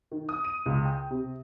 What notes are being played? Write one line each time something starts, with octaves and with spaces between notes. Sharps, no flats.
D#3
D#6
D#7
C#2
G5
C3